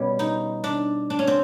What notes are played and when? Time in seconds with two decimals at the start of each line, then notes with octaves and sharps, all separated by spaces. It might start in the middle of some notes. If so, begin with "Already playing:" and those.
Already playing: B2 G3 B3 C#4
0.19 D#4
0.64 D4
1.10 D4
1.19 C#4
1.27 C4